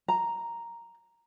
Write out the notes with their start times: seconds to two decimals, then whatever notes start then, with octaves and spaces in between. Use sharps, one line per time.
0.08 A#5